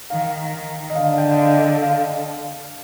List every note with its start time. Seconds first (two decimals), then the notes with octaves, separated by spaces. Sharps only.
0.10 D#3 F5
0.53 D#3
0.90 D#5
0.95 D3 F5
1.18 G5
1.32 D#5
1.38 F5
1.59 D#5
1.82 F5